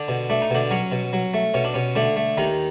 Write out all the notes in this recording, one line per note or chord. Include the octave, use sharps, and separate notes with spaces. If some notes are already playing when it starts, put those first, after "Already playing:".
Already playing: D3 D4
B2
A3 D4
D#4
B2 D3 D4
F#3 C#4
B2
F#3
A3
B2 C#4
D4
B2 C#4
D3 A3 D4
A3
D#2 D#3 D#4